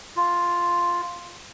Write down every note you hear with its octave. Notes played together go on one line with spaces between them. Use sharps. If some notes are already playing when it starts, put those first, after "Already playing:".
F4